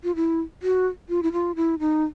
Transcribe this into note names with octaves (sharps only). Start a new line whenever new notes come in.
F4
E4
F#4
F4
E4
F4
E4
D#4